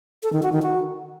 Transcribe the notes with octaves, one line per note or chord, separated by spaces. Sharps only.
A4
D#3
F#4
D#3
F#4